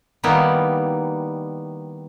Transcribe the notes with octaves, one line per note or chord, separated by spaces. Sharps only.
D#3 G3 A#3 B3 D#4 E4